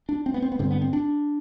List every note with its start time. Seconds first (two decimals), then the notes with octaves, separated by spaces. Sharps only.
0.09 D4
0.26 C4
0.34 B3
0.42 C4
0.52 B3
0.59 G2 D3 C4
0.71 B3
0.82 C4
0.93 D4